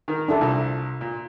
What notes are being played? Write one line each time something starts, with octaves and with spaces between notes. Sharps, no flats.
D#3 A#4
D4 E4 A4
C2 A#2
A#2